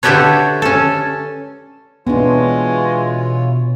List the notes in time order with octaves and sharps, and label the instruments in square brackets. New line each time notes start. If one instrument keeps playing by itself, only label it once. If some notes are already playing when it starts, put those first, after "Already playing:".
[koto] D3 E4 G4 A4 B4 C#5
C#4 A4
[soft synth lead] B2 [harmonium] E3 F4 C#5 [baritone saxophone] G#3 [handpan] B3 D4